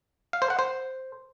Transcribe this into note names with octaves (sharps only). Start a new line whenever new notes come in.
F5
C5
F#5
C5